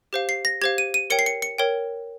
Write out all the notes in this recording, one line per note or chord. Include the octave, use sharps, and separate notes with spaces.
G4 C5 F5
C7
A#6
G4 C5 F5 G#6
D#7
D#7
A#4 C#5 G5 C#7
C7
C#7
C#7
A#4 C#5 G5